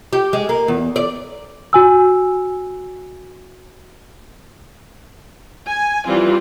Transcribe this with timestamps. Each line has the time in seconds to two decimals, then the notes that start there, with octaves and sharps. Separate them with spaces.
0.13 G4
0.33 G#3
0.49 A#3
0.68 E2
0.96 D5
1.73 F#4 G#5 E6
5.66 G#5
6.06 E3 F3 G3 C4 F4